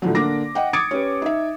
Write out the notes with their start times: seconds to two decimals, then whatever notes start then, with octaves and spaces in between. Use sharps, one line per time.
0.02 A2 D3 F3 F#3
0.15 D3 A#3 D4 D6 A#6
0.55 D#5 F#5 G5
0.73 D6 D#6 G#6 A6 C#7 D7
0.91 C#4 G4 B4
1.22 D#4 E5